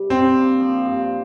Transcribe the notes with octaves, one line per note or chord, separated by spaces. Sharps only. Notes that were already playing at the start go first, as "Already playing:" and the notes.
Already playing: C3 G3
G2 C4
A#3
F3
G2